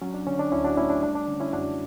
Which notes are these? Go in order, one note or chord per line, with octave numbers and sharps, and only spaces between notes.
F#3 C#4
D4
D3 C#4
D4
D2 C#4 E4
D4 F#4
A3 C#4 E4
D4
G3 D4
D4
D3 C#4
C#4 E4
F#2 D4 F#4